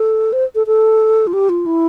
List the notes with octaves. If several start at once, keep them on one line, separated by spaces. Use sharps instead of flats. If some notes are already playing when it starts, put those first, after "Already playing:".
Already playing: A4
C5
A4
A4
F4
G4
F4
E4